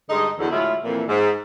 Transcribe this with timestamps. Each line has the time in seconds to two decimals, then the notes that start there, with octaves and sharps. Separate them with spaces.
0.09 G2 D3 G#3 D#4 D#5
0.39 E2 D3 F#3
0.51 A2 D3 F#3 G#3 E4 F4
0.84 F2 A#2 E3
1.08 G#2